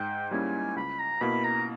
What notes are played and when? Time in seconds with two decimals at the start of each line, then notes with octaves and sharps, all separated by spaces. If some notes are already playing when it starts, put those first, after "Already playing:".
Already playing: G#2 G5
0.31 G3 A#3 C#4 E4 G#5
0.76 C#2 B5
0.99 A#5
1.21 B2 A#3 E4 B5
1.44 A#5